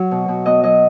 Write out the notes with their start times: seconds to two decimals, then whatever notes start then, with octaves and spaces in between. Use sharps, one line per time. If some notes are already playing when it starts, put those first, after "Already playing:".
Already playing: F#3
0.11 B2
0.28 B2
0.46 B3 D#5
0.63 F#3 D#5